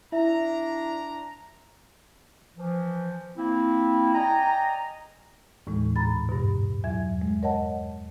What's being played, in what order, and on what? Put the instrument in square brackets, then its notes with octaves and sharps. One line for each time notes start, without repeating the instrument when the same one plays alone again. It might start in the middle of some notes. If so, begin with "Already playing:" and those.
[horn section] D4 A#5 [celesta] E4 E5
[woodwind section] E3 F3
A#3 C4 E4
D5 D#5 G5 G#5 A#5
[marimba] D#2 A2 E3 G#3
G#2 A#5 B5 A6
G2 B2
E2 F#3 E5 G#6
G#3
A#4 C#5 D#5 F#5 A5